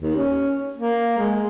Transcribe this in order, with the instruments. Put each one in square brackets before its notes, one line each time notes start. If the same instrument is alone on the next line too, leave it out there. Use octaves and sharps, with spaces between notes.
[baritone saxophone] D#2
C#4
A#3
G#3